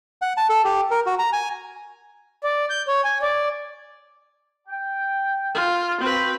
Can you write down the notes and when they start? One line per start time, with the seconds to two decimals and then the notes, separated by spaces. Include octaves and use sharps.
0.22 F#5
0.37 A5
0.50 A4
0.64 G4
0.91 A#4
1.06 F#4
1.19 A#5
1.33 G#5
2.44 D5
2.70 G6
2.88 C#5
3.04 G#5
3.22 D5
4.68 G5
5.55 F4
6.01 C4 F#4 B4 C5